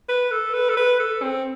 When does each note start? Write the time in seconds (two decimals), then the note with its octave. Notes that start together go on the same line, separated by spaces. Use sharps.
0.09 B4
0.31 A4
0.54 B4
0.69 A4
0.77 B4
0.99 A4
1.22 C4